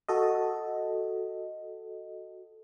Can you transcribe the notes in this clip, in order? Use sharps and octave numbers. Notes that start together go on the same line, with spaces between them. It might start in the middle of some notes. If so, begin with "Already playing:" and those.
F#4 A4 D#5